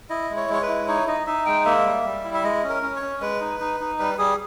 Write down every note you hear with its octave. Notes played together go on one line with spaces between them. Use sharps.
E4 D#5
G#3
C#5
G#3 C#5
B4
E4
D#4 C#5
D#4 D#5
D#4 E5
G#3 G5
A#3 E5
G3
G3
E4
E5
G#3 D#5
C#4
A#4
C#4
C#5
C#4
G#3 B4
D#4
D#4
D#4
G3 B4
G3 G#4